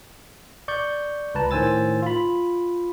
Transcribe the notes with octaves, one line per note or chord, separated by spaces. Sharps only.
D5 C#6 G6
C#2 B4 A5 A#5
A2 D#3 C5 G#5 E6 A6
F4 B5